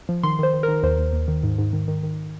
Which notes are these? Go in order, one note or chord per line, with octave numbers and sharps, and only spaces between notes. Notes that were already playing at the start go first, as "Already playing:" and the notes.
F3
D#3 C6
D#3 C5
D#3
A#4
D#3
D#2 C5
D#2
D#2
D#3
G#2
G#2
D#3
D#3
D#3